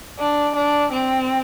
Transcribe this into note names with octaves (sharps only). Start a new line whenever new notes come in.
D4
D4
C4